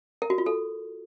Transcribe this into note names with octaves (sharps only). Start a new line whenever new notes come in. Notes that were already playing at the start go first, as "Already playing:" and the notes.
A#4
F#4
F4
A4